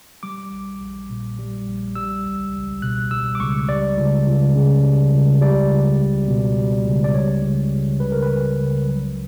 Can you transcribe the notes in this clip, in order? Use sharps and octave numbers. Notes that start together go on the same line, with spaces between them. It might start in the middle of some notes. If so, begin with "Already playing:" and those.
G3 D6
A#1
A#1
A#2
G3
A#1
G3 E6
C#2
C#2
B2 F#6
G3 E6
D6
C#2 C#6
G3 D5
C#2
C#2
C#3
G3
C#2
G3 D5
C#2
C#2
B2
G3
C#2
D5
G3 C#5
C#2
C#2
C#3 B4
A#4
B4
G3
C#2
F#3